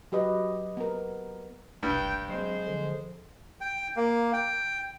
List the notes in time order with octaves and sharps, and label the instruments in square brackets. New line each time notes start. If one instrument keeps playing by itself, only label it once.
[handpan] F#3 G4 B4 D#5
B3 A#4
[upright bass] F1 B1 [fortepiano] G2 [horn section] G5
[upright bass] F#3 C4 [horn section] G#3 C5
[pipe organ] D3 F3
[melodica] G5
A#3
G5